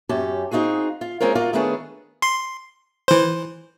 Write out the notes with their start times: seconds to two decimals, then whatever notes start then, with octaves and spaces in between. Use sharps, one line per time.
0.09 F#2 C#4 G4 A5
0.51 C4 D#4 F4 F#4 G#4
1.01 F4
1.20 G#3 C4 C#4 F4 A#4
1.35 F4 F#4 A#4 D5
1.53 D#3 A3 B3 C#4 D4 G#4
2.22 C6
3.08 E3 C5